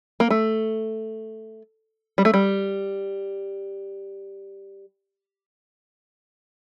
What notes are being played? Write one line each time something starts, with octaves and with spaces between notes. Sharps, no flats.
A#3
A3
G3
A3
G3